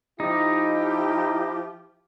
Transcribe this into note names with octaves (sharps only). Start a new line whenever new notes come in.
F3 D#4 E4 G4